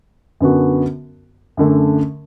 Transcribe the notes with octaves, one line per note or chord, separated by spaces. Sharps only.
F#2 D3 B3 F#4
F#2 D3 A3